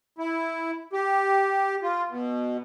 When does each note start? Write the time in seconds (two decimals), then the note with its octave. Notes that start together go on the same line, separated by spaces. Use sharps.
0.18 E4
0.93 G4
1.83 F4
2.09 B2